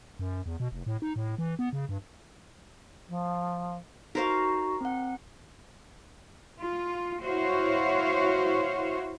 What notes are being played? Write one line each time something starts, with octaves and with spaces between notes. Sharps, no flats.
F#2
E2
B2
F1
A2
D#4
A2
E3
B3
C#3
G2
F3
D#4 F#4 A#4 C5 F5
C4 F#5
F4
E4 F#4 C5 C#5 F5